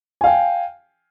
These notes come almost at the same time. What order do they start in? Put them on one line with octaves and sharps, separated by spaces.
G#5 F5 G5